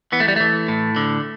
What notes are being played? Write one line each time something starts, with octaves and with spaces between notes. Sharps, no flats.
E3 B3
A3
G3
E3 A3
A2
D3